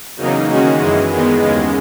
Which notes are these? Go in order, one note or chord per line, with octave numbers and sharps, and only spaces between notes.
E2 C#3 F#3 A#3 D#4
D#3 G#3 C#4 F#4
F#2 E3 G#3
E2 D#3 G#3 B3
D#2 C#3 G#3